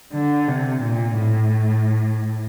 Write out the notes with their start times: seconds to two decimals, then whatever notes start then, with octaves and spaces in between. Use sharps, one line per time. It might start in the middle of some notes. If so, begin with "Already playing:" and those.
0.13 D3
0.48 C3
0.83 A#2
1.19 A2